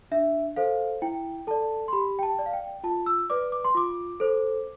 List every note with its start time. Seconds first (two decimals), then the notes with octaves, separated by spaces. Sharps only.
0.11 D4 E5
0.56 A4 C5 F5
1.02 E4 G5
1.47 A4 D5 A5
1.88 C6
1.92 G4 B5
2.19 G5
2.23 A5
2.39 D5
2.46 F5
2.53 G5
2.84 F4 A5
3.06 E6
3.30 B4 D5 D6
3.52 D6
3.64 C6
3.75 F4 D6
4.20 A4 C5